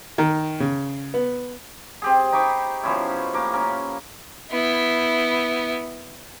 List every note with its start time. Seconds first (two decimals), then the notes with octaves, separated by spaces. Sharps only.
0.18 D#3
0.60 C#3
1.14 B3
2.02 C4 G4 G#4
2.32 D#4 B5 C#6 D6
2.83 B2 F3 C#4 E4
3.34 A3 A#3 D6
3.53 C#4 A#4
4.51 B3 E4